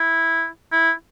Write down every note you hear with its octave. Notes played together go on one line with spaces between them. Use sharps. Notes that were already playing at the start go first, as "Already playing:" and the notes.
Already playing: E4
E4